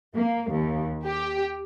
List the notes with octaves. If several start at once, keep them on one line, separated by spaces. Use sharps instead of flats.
A#3
D#2
G4